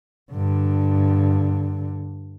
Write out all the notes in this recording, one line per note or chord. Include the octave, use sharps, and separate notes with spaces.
G2 D3